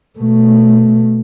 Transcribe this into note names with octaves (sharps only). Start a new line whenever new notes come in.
B2 A3